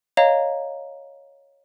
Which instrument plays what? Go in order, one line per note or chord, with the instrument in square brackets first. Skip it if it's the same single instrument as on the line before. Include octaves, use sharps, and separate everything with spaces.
[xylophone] C#5 D#5 F5 A#5